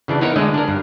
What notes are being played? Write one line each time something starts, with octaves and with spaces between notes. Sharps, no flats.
C#3 E3 D4
B3 D#4 E4 A#4 C#5
D3 G#3 A3 D#5
D4 A#4
G2